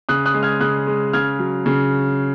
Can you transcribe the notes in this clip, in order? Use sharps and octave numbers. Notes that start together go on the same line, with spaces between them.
C#3 D#6 F#6
D#6 F#6
G#3
F6 G#6
C#3 D#6 F#6
G#3
C#3 F6 G#6
F#3
C#3